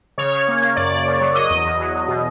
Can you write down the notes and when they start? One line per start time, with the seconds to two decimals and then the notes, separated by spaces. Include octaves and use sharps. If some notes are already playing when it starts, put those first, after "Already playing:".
0.18 C#3 C#5
0.33 C#3
0.48 A#3
0.62 A#3
0.76 F#2 D5
0.91 F#2
1.06 C#3
1.20 F#3
1.35 F#3 D#5
1.50 E2
1.65 E2
1.80 F#3
1.94 E2
2.08 B2